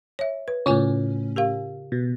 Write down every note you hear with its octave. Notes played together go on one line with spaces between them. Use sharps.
C#5 E5
B4
A2 C#3 C#4 F4 G#5
G4 A#4 F5
B2